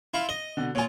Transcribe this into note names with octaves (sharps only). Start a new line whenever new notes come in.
E4 F4 F5
D#5 G7
B2 D3
A#2 F4 C#5 G#5